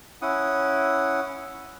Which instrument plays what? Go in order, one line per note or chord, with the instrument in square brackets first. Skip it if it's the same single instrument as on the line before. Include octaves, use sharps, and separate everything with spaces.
[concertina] C#4 E4 F#5 D#6